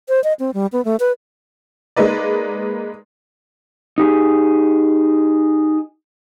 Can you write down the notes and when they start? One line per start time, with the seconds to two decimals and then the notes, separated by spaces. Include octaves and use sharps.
0.09 C5
0.24 D#5
0.39 C4
0.54 G3
0.72 B3
0.85 A3
1.00 B4
1.96 G#3 A#3 D#4 B4 D5
3.98 D#4 G4 G#4